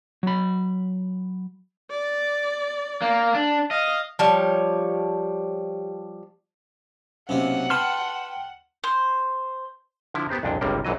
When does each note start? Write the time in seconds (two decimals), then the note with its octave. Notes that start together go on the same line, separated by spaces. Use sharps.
0.23 F#3 B5
1.91 D5
3.02 A#3
3.34 D4
3.71 D#5 F5
4.19 F3 G3 C#5
7.29 B1 C3 A#3 C#4 F#5
7.70 B4 G5 A5 C6 F6
8.84 C5
10.14 D3 F3 E4
10.29 B3 G4 C5 A#5
10.43 C2 F2 A#2 D4 G5
10.61 G1 C#2 C3 G3 A#3 G5
10.85 A#1 F#2 E3 F#3 D#5